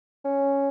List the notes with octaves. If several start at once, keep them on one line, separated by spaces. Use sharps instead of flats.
C#4